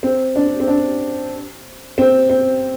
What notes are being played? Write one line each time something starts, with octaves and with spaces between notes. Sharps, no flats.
C4
D4
C4
D4
C4
C4